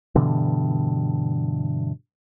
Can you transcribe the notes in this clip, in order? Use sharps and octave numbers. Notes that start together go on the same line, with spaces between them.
G2 B2 D3 E3